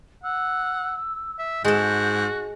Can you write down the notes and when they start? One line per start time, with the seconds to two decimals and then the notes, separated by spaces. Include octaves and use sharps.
0.24 F#5 E6
1.39 E5
1.64 G#2 G#3 F#4 A4 G6